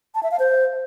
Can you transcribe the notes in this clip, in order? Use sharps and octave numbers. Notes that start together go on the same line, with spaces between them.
A5
E5
F5
C5